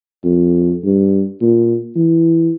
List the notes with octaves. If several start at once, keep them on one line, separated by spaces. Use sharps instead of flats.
F2
G2
A#2
E3